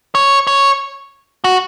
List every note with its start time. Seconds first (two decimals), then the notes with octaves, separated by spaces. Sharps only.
0.15 C#5
0.47 C#5
1.44 F#4